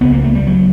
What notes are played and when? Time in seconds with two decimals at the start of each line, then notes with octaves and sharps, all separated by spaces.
0.01 C#2 B3
0.05 C#3
0.12 A#3
0.24 A3
0.35 G3
0.47 F#3